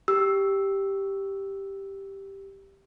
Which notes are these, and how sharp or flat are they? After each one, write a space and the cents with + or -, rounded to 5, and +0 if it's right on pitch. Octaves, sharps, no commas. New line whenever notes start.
G4 +0 E6 +0